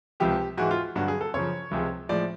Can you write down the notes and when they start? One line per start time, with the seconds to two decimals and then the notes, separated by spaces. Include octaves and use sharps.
0.20 C#2 C3 F3 G4
0.58 G#2 E3 G#3 F#4
0.71 F4
0.96 G2 D3 F#3 F#4
1.08 G#4
1.21 A4
1.34 F#2 C#3 F3 C#5
1.71 C#2 C3 F3 G#3
2.09 A2 F3 G#3 D5